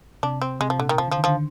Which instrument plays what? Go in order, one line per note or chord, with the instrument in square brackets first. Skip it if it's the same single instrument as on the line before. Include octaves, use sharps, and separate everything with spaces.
[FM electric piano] C3 [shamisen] D4
[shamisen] C4
[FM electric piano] C3 [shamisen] G#3
[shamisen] F3
[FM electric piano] A#2 [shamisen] D3
[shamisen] D#3
[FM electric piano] C3 [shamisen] F3
[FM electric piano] D3
[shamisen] F3
[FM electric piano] D#3
[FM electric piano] D3 [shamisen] F3